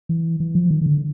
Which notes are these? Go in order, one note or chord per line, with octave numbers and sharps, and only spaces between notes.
E3
E3
F3
D#3
D#3
D3